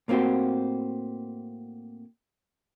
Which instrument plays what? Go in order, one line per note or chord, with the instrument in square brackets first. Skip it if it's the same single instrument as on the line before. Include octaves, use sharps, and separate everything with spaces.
[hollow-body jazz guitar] A2 A#3 C4 E4 F#4 G4